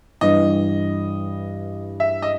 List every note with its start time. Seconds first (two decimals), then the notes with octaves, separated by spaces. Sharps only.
0.21 G2 E3 G3 D#5
2.00 E5
2.22 D#5